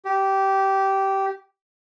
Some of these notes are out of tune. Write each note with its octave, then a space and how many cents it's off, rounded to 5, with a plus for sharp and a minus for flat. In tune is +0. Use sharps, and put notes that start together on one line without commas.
G4 -15